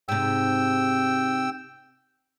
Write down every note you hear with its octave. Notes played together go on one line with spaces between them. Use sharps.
G#2 C3 G5 E6